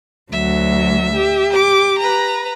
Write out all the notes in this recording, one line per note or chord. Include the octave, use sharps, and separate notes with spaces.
D2 F#3 E5
G4
D6
B4 A#5